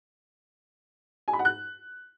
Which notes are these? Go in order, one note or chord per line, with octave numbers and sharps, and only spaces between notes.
G#5
B5
F#5
F#6